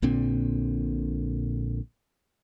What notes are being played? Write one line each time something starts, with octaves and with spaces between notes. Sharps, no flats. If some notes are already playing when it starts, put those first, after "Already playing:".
A#1 A#2 D3 C4